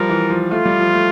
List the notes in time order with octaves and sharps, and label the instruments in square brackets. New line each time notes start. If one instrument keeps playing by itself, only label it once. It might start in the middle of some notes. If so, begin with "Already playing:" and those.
Already playing: [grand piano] F3 G3 [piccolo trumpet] A#4
[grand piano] E3
F3
[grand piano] A3 [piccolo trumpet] F4
[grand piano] G3
F3
A3